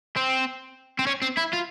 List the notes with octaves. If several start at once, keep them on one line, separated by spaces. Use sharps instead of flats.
C4
C4
C#4
C4
E4
F4